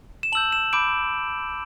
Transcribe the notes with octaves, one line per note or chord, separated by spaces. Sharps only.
E7
A5 E6 G6 F#7
E7
B5 D6 G6 D7